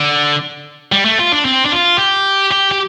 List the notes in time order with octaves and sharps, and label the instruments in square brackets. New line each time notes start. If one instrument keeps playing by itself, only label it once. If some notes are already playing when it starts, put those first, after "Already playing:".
Already playing: [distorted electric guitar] D3
G3
A3
F4
D4
C4
D4
F4
G4
G4
G4